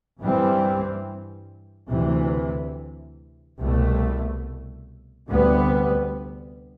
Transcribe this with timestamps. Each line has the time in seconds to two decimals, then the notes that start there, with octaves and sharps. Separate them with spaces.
0.20 G2 E3 G3 C4
1.90 D2 C3 E3
3.59 C2 B2 A3
5.29 D2 C3 G3 B3